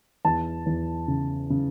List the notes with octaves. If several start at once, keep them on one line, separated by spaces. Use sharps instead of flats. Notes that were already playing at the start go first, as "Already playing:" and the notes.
E2 A5
E2
C#3
C#3